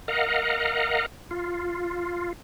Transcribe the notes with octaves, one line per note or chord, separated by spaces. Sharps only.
A#4 D#5 F5 F#5
F4